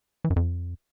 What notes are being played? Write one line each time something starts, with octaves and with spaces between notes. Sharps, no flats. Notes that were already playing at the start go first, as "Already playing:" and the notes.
E3
F#2
F2